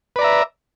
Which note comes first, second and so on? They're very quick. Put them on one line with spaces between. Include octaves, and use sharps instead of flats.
B4 D5 A#5 E5